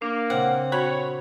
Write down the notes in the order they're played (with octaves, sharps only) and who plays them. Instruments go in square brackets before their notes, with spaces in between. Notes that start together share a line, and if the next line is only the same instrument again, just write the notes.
[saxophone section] A#3 [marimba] D4
[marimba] A#2 C#3 [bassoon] C4 [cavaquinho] F#5
[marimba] F#4 [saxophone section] C#5 [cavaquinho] B5